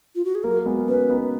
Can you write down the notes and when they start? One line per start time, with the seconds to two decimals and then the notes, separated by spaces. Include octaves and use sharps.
0.15 F4
0.25 F#4
0.35 G#4
0.44 F#3 A#3 A#4
0.66 G#3 B3
0.88 A#3 C#4 B4
1.10 B3 D#4